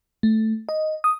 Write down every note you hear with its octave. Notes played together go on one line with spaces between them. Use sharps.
A3
D#5
D#6